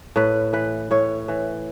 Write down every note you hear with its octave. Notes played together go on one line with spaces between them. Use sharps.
A2 B4
E3 B4
A2 C#5
E3